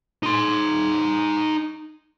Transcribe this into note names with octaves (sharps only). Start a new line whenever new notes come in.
D#4 C6